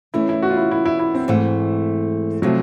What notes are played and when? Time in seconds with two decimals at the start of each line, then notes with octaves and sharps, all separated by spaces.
0.14 E3 A3 C#4 E4
0.29 E4
0.42 F#4
0.50 F4
0.57 E4
0.71 E4
0.86 E4
0.99 E4
1.15 C4
1.28 G#2 E3 A3
2.42 C3 F3 F#3 A3